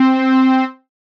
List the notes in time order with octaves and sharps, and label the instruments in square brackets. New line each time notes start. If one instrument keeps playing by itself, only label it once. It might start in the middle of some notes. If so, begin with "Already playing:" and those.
Already playing: [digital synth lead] C4